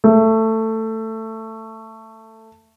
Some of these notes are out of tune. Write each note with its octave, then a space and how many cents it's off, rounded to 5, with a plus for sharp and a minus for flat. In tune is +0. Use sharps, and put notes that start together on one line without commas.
A3 +15